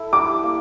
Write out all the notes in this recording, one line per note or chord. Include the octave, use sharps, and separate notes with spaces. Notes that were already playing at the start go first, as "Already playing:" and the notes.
Already playing: E4 A4
G3 D6
A#3